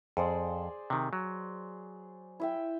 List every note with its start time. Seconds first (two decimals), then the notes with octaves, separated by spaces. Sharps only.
0.17 F2 G#4 C5 D5
0.90 C3 D#3
1.13 F#3
2.40 E4 E5 G5